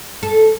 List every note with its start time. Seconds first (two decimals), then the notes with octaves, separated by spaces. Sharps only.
0.23 A4